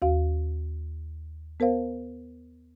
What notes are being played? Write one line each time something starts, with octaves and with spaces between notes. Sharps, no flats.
D#2 F#4 F5
B3 A#4 C5 F5